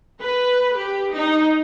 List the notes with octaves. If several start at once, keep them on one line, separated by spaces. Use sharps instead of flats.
B4
G4
D#4